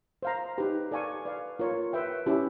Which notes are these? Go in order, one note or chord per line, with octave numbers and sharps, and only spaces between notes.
C5 F5 A#5
D#4 G4 B4
A4 D5 F5 G#5 C#6
B4 D5 F5
F4 A#4 C#5
B4 E5 G5
C#4 E4 G4